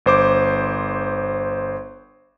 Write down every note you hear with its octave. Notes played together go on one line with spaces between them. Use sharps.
G1 C5 D6